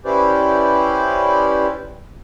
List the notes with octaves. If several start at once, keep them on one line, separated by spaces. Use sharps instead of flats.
C#4 E4 G4 B4 C5 D5